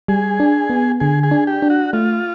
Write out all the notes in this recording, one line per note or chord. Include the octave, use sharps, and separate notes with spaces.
G3 G#4
D4
B3
D3 G#4
G#4
D4
G4
D4
F#4
A3 F4